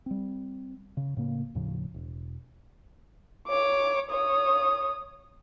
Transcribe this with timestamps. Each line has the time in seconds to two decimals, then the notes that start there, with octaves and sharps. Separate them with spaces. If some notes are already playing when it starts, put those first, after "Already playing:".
0.06 G3 C4
0.97 C#3
1.17 A2 C#3 A#3
1.55 D#2 A2 C#3 F3
1.94 E1
3.48 C#5 D6
4.10 C#5 D#6